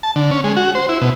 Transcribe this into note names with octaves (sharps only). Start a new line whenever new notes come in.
A5
D3
C#4
G#3
F#4
C5
E4
B2